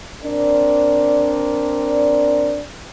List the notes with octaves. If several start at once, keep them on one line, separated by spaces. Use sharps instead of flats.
C4 D4 A#4 D5